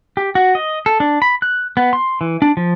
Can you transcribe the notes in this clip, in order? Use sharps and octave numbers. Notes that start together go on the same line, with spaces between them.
G4
F#4
D#5
A4
D4
B5
F#6
B3
C6
E3
D4
F3